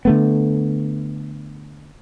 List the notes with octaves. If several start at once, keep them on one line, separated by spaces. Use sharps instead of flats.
D3 A3 B3